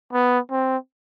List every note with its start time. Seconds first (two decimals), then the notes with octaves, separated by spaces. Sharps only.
0.13 B3
0.51 C4